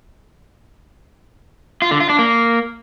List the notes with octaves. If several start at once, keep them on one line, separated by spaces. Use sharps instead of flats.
F4
D3
F4
D4
A#3